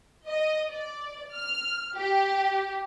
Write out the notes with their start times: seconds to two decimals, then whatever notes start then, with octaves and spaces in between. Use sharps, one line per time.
0.26 D#5
0.69 D5
1.33 F6
1.95 G4